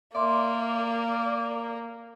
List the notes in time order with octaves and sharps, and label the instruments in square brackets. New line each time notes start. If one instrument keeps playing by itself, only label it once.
[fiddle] A#3 [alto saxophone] D5 [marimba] E5 C6 D6